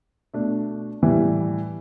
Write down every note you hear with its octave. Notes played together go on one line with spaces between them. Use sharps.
B2 A3 D4
A2 E3 G3